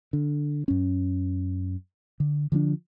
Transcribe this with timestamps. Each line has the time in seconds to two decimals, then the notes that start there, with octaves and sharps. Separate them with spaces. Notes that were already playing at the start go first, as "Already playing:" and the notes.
0.13 D3
0.68 F#2 C#4
2.20 D3
2.52 D3 F3 C#4 D4